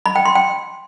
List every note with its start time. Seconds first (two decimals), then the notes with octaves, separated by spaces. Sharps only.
0.06 B5
0.16 G5
0.25 C6
0.35 G5